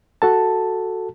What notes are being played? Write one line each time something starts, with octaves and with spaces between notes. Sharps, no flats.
F#4 A4 A5